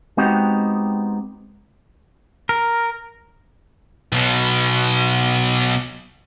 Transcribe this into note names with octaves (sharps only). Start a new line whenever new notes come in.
G#3 B3 C4 D#4 F#4 G4
A#4
B1 B2